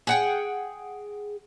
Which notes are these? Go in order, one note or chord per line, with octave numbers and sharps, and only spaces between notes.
G#4 F#5 G5